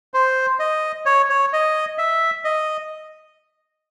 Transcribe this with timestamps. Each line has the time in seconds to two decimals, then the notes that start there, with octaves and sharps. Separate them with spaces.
0.14 C5
0.59 D#5
1.06 C#5
1.29 C#5
1.53 D#5
1.98 E5
2.45 D#5